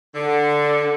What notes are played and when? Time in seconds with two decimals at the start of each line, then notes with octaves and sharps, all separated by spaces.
0.15 D3